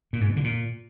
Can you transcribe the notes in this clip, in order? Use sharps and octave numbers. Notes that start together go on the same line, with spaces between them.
A#2
G#2
B2
D3
A#2